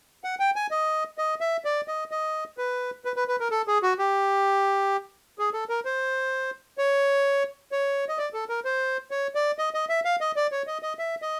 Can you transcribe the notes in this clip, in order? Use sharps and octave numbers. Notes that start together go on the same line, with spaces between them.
F#5
G5
G#5
D#5
D#5
E5
D5
D#5
D#5
B4
B4
B4
B4
A#4
A4
G#4
F#4
G4
G#4
A4
A#4
C5
C#5
C#5
D#5
D5
A4
A#4
C5
C#5
D5
D#5
D#5
E5
F5
D#5
D5
C#5
D#5
D#5
E5
D#5